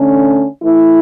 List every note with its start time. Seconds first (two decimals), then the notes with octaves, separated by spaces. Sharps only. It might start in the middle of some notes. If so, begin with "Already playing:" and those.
Already playing: D3 A3 C#4
0.62 E3 A3 E4